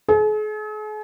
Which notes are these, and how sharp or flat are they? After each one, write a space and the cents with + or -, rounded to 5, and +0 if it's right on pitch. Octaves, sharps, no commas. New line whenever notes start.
G#4 +45